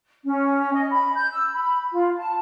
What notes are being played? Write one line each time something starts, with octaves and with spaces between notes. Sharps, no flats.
C#4
D#5
B5
G6
E6
B5
F4
A5